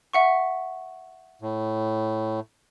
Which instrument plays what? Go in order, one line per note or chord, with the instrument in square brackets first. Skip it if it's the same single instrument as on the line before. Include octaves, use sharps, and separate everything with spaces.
[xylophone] E5 F#5 C#6
[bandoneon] A2